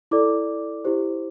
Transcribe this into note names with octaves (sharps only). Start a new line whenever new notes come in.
E4 A4 D5 D6
E4 G4 C5